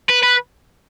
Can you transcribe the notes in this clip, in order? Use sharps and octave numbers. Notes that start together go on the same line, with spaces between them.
B4
B4